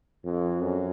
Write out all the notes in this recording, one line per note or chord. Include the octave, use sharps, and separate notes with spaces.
F2
F#2